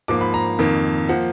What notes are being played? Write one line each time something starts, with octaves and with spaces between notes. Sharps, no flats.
G#2 F3 A#3 D6
B5
A#5
F2 D#3 A#3
F3 A#3 F#5